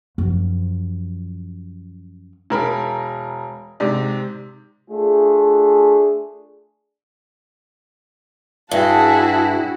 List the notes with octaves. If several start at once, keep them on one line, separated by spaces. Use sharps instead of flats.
F#2 F3
E1 A#4 B5
G#2 C3 D5
A3 D4 F4 G#4
G2 E4 F#4 G#4 E5 G5 A5 A#6